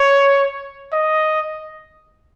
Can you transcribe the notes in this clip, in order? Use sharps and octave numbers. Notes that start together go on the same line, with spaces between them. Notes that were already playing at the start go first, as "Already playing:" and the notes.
Already playing: C#5
D#5